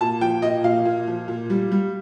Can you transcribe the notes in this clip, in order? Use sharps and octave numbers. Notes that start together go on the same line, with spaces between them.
A#2 A5
F3 G5
A#2 D#5
A#2 F5
A#2
F3
A#2
G3
G3